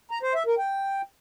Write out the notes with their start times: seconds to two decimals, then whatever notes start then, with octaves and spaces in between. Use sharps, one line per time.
0.11 A#5
0.23 C5
0.35 E5
0.46 A#4
0.58 G5